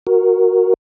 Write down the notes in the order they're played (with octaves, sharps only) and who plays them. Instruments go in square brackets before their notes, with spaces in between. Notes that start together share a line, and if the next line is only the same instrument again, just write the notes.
[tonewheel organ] F#4 A#4